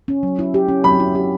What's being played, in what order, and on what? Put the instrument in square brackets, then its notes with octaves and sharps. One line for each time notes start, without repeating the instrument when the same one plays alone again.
[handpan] C#4
F#3
E4
G4
C#4
[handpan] F#3 [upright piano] B5
[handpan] E4
G4